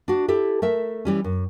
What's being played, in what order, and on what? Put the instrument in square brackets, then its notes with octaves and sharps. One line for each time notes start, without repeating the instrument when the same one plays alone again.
[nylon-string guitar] D4 F#4
E4 G4 A4
A3 A#4 E5
E3 G3 C#4
F#2